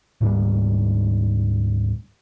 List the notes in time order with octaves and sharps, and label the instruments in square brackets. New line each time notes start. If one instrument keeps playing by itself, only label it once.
[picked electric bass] D2 G#2 G3 A#3